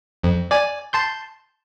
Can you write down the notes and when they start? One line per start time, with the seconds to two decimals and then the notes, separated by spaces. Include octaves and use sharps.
0.23 F2
0.51 D5 G#5
0.93 A5 C6 G6